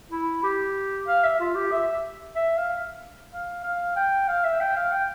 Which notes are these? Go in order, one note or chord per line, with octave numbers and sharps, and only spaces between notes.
E4
G4
F5
E5
F4
G4
E5
E5
F5
F5
F5
G5
F5
E5
G5
F5
G5